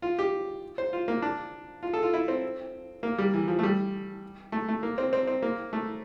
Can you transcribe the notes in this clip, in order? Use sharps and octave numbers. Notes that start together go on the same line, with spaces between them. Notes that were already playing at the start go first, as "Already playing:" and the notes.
F4
G4
C5
F4
A#3
D4
F4
A4
F4
E4
C4
A#3
G3
E3
F3
A3
G3
A3
A3
A#3
C4
C4
C4
A#3
A3